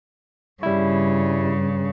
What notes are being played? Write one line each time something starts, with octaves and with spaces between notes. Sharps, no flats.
G2 C#3 G3 E4